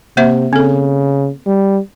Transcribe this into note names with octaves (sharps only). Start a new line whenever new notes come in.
C3 A#3 C5 E5
C#3 C4 A4
G3